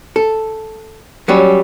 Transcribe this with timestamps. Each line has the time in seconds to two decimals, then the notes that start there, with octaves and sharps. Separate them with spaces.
0.16 A4
1.28 F#3 G3 C#4